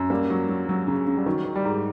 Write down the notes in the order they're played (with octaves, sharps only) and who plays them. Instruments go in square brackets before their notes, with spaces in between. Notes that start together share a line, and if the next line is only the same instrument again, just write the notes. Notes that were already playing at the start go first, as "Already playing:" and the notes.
Already playing: [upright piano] F#2
[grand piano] G3 [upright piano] A#3
[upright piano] F#3
F#3
F#3
C#3
C#3
[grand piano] G3
[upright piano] D#3 [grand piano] F#3
[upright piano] D#3
[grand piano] G3
[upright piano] G#2